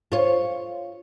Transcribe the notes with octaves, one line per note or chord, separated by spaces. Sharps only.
F4 C#5